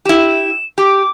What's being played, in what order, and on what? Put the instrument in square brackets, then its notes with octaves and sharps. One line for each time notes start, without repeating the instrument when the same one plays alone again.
[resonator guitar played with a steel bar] E4 G4 [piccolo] E7
[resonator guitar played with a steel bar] G4 [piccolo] D6